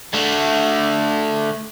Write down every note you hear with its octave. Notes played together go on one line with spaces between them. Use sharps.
D3 A3